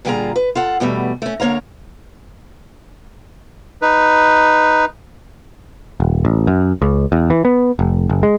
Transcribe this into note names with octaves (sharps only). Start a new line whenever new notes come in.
A#2 D3 G3 F4 G#4 A#5
B4
F4 A4 F#5
E2 B2 G3 A3
A3 C#4
D3 A#3 C#5 F5 A#5
D#4 B4
D#1
A1
F#2
C#2
E2
E3
B3
F1
F#1
G#3